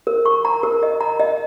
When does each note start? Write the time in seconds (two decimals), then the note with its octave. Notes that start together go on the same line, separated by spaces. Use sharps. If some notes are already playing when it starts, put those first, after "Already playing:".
0.07 A#4
0.26 C#6
0.45 A#5
0.63 A#4
0.83 D#5
1.01 A#5
1.20 D#5